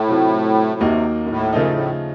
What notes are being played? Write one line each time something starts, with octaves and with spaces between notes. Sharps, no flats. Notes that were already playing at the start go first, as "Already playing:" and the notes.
Already playing: A2
C3 F#3 C4 F4
D#2 C3 D#3 A#3 D#4 F#4
F#2
A2
F#2 C#3 F3 A3 D#4
A2